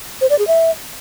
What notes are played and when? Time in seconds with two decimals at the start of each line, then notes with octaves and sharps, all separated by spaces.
0.21 C5
0.30 D5
0.39 G#4
0.47 E5